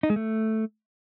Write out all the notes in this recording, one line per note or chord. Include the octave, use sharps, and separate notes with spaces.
D#4
G#3
A3